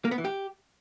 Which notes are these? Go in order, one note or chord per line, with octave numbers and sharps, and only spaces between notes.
A#3
B3
E3
G4